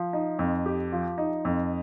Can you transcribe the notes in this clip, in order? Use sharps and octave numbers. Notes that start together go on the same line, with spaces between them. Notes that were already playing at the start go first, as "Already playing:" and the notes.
Already playing: F3
D#4
F2
G4
F3
D#4
F2